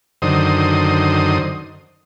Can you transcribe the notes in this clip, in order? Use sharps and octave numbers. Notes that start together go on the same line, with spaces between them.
F#2 D3 D#3 C5 D#6